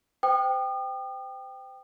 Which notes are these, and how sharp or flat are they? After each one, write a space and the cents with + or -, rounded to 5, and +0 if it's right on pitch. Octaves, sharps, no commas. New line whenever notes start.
C5 -35 G5 +0 D#6 -40